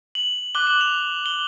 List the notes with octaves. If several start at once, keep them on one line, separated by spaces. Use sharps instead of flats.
F#7
D6 F#6 G7
F#7
F7
G7